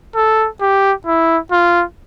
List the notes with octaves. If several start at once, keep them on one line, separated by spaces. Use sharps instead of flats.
A4
G4
E4
F4